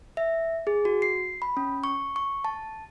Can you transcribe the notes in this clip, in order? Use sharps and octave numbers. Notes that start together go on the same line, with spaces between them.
E5
G#4
F#4
C7
B5
C#4
C#6
C#6
A5